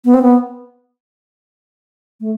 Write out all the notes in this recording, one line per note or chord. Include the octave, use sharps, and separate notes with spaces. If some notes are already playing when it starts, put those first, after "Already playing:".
B3
C4
B3
A3